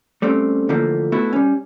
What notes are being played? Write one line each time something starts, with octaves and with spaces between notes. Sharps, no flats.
G3 A3 C4 C#4
D3 E3 F3 A3 A#3
A3 B3 E4 F#4 A4
G3 C#4